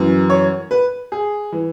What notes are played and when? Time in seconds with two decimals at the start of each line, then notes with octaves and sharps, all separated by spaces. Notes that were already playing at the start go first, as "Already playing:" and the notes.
Already playing: F#2 E3
0.30 C#5
0.71 B4
1.12 G#4
1.52 E3